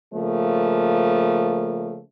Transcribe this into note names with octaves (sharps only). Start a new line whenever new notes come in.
C#3 F3 A3 A#3